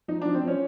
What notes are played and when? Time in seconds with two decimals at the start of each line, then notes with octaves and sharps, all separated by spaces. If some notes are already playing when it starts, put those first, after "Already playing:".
0.08 F3 D#4
0.22 F3 D4
0.34 C4
0.43 F3 C#4